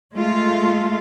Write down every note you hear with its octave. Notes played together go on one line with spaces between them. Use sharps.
G#3 A3 F4